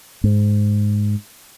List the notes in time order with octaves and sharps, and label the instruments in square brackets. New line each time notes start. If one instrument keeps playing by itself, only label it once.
[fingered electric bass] G#2